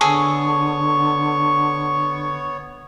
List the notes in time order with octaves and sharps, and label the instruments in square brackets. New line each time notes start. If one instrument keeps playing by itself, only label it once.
[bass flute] D3 [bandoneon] B3 C#5 [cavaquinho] G#4 A4 [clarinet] C#6